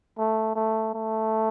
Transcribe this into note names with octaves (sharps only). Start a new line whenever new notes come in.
A3
A3
A3